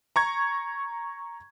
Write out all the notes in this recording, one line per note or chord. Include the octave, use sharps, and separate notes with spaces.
A#5 C#6 G#6